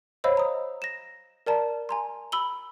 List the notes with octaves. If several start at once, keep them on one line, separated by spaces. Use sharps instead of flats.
C5 C#5 D#5 F5 B5 E6
A#5 D#6
A#6 E7
A#4 D5 A5 A#5
G#5 A#5 C6
B5 E6 F#7 G7